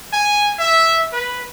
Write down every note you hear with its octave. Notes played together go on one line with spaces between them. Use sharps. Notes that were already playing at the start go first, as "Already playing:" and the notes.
G#5
E5
B4